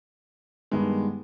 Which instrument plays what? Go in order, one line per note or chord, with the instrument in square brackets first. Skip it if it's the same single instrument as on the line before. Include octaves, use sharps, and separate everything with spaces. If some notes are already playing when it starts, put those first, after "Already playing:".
[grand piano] G2 D#3 G#3 B3